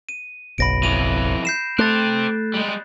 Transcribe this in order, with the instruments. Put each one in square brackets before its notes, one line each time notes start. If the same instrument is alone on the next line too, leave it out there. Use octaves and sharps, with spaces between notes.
[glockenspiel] D#7
[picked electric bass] F#1 B1 [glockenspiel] B5 A#6 D7
[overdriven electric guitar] F2 E3 [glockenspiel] D#7
[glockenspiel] G6 C7 E7
[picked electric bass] A3 [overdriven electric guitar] C4 G4 [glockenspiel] F#6 A6
[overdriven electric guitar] G3 G#3